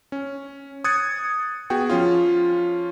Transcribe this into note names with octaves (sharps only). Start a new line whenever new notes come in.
C#4
D#6 F#6 G#6 A6 C#7
B3 F#4 G#4 G5
F3 C#4 F4